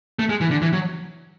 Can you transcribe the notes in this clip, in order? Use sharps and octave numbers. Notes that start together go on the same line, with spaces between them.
A3
G#3
E3
D3
E3
F#3